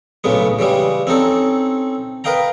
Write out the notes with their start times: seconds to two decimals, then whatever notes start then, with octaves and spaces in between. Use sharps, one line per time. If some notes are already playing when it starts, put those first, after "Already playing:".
0.24 B1 A2 C#3 G#3 B3
0.59 C#3 E3 G3 G#3
1.07 C4 C#4 D#4 A4
2.24 A#4 B4 D#5 F5 G5 A#5